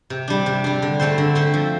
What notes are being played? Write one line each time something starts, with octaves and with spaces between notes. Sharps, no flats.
C3
G3 D4
C3
G3 D4
D3
A3 C4 A4 C5
D3
A3 C4 A4 C5
F3